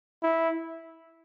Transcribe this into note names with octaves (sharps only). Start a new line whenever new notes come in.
E4